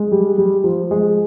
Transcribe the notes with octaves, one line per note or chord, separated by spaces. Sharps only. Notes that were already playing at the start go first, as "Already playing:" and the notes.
Already playing: G#3
G3
G3
F3
G#3